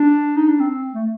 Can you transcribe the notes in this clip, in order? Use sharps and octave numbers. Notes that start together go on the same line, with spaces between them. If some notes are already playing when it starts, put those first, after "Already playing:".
Already playing: D4
D#4
D4
C4
A3